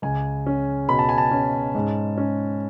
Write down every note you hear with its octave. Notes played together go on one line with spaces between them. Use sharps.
C#2 G#5
C#4
B2 B5
A5
G#5
A5
C#4
G#2
C#4